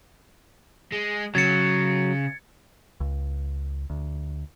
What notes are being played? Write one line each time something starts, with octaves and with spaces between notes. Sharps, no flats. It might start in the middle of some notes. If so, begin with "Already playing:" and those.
G#3
C#3 F#3 G#6 A6 C#7
C#2
D2